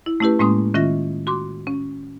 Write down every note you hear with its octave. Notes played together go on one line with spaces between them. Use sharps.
E4
A3 C#4 E4 G4 B4
A2 G#3 A#3 C#4 C6 D#6
D#3 C#4 F4 E5 A#6
F#4 C6 D6
C#4